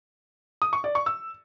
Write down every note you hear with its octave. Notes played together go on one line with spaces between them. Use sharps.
D#6
C#6
D5
C#6
E6